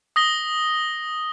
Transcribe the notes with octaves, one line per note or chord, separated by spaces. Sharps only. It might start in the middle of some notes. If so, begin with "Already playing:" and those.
D#6 A#6 G7